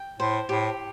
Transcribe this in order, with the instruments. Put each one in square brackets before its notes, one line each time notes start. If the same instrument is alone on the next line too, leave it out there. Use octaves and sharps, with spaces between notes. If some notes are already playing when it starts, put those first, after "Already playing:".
Already playing: [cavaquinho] G5
[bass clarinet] A2 [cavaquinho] C5
[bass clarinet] A2 [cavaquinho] G4